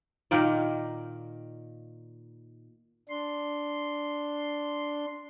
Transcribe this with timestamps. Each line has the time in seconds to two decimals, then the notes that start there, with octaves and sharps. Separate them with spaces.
0.31 A#2 D#3 A#3 D5
3.09 D4 C6